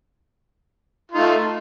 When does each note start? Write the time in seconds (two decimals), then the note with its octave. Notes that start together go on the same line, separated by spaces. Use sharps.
1.11 F4
1.14 D#4
1.17 A3